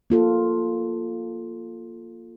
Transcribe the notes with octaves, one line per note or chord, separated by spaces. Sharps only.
A#3 F4 A4